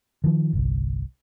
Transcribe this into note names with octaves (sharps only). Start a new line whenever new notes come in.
D#3 F3
G1 C2